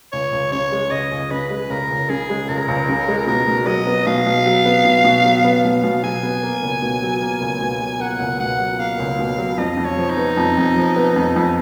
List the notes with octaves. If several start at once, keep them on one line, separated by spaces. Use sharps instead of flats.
C#2 C#5
C#2
C#3 C#5
G#3
C#2 D#5
C#2
C#3 B4
G#3
C#2 A#4
C#2
C#3 G#4
G#3
C#2 A#4
C#2
C#3
G#3
B2 A#4
B2
F#3 D#5
B3
B2 F5
B2
F#3
B3
B2
B2
F#3
B3
B2 F5
B2
F#3 G#5
B3
A#3
C#2
B2
F#3
A#3
C#2
B2
F#3
A#3 F#5
C#2
B2 F#5
F#3
A#3 F5
C#2
B2
F#3
F2 D#5
F2
C#5
F3
D#4
B3
F2
F2
F3
B3
F2
F2